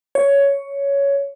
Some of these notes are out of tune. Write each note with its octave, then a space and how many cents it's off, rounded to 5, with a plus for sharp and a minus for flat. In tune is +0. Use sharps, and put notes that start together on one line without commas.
C#5 +10